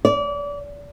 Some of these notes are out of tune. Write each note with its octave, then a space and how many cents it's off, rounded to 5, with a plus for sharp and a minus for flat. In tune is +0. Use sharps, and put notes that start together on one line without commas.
D5 -30